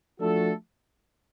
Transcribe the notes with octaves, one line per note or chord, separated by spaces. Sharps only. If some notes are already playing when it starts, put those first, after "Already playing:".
F3 A3 D4 F#4 A4